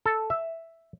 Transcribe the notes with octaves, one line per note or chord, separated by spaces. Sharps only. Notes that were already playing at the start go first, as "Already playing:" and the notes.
A4
E5